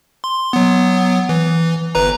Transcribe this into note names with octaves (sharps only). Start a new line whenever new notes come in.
C6
F#3 B3
E3
G1 B4 A#5